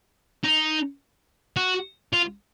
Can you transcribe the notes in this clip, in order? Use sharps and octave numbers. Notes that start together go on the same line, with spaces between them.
D#4
F#4
F4